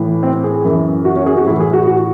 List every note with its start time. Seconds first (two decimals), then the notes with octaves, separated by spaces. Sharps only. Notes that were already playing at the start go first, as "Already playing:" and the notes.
Already playing: A2 E3
0.23 C4
0.44 G#4
0.64 F#2 E3
1.05 F#4
1.16 C#4
1.26 G#4
1.37 F#4
1.47 A2 E3 E4
1.60 G#4
1.73 F#4
1.87 F#4